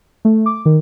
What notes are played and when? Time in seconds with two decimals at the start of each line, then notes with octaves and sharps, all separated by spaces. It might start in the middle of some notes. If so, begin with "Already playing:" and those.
0.25 A3
0.46 D6
0.66 D#3